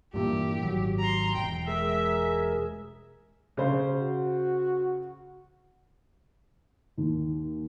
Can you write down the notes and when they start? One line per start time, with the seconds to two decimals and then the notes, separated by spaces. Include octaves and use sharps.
0.14 G2 A#2 E3 G4
0.62 G#1 F#3
0.99 A#5 C6
1.35 E1 G5
1.67 G#3 G#4 A#4 E5
3.57 C#3 C5
3.94 F#4
6.98 D#2